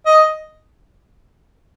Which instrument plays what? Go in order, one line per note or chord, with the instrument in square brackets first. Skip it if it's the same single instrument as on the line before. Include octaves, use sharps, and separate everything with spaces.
[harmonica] D#5